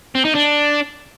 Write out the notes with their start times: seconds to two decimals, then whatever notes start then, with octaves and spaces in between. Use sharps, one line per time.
0.15 C4
0.25 D#4
0.35 D4